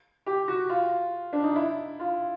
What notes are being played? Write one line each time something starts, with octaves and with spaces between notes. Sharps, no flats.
G4
F#4
F4
D4
D#4
E4
F4